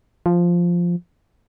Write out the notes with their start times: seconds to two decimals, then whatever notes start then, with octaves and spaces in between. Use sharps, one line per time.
0.26 F3